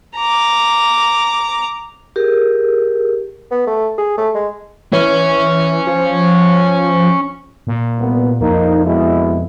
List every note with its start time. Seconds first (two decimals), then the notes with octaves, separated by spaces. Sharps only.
0.17 A#5 D6
2.16 G4 G#4 A#4
3.51 B3
3.67 A3
3.98 G#4
4.18 A3
4.35 G#3
4.93 E3 C#4
5.87 F3
7.67 A#2
7.98 C2 B3
8.41 A#1 F2 A#3 D#4
8.85 B2 G#3 E4